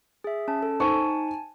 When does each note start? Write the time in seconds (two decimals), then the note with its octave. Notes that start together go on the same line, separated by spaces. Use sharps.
0.24 G#4 E5
0.48 C#4 A5
0.63 A4
0.80 D#4 C5 G#5 A5 C#6